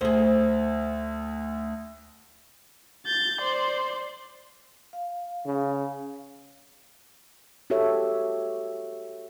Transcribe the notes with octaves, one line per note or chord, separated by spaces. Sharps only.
D2 G#4 C5
G6 A6
C5 D5
F5
C#3
F#4 G4 A4 C#5 E5